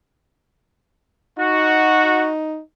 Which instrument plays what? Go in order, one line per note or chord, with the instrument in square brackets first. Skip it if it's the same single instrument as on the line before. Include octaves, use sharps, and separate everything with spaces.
[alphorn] D#4 [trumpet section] F#4